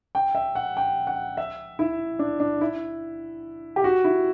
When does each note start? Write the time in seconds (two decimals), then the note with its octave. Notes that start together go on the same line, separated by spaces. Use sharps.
0.15 G5
0.35 E5
0.55 F#5
0.77 G5
1.07 F#5
1.37 E5
1.79 E4
2.19 D4
2.40 D4
2.61 E4
3.76 G4
3.84 F#4
4.04 E4